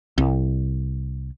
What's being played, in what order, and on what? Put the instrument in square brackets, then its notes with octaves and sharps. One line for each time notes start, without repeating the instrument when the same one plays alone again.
[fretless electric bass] C2